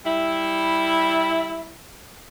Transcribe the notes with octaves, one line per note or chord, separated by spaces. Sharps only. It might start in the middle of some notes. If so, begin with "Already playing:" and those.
G3 E4